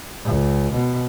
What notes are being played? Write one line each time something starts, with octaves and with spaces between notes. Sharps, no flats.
C#2
B2